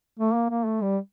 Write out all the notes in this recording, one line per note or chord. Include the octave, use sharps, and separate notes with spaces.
A3
A#3
A#3
A3
G3